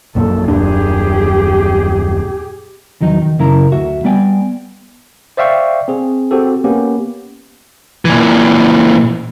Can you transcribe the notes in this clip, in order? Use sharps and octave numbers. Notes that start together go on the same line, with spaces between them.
A#1 F#2 A#2 A4
D#1 F#2 D4 G4 G#4
E2 D#3 F#3 D#4
D#3
F#2 C#3 E4 A#4 A#5
D2 F#4 E5
G3 B3 D5 G5 G#5
C5 D5 E5 F5 G5 C#6
C4 G#4
C4 F#4 G4 A4
A#3 B3 C#4 G4
A#2 E3